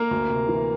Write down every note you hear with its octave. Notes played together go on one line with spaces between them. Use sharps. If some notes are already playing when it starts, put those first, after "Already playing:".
Already playing: A#3 A#4
D2
C3
E3